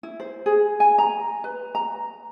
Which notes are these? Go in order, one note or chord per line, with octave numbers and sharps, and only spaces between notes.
E4
C5
G#4
G#5
A#5
B4
A#5